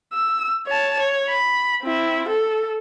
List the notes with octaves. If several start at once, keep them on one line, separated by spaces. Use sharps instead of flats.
E6
C#5 A5
C#5
B5
C4 E4
A4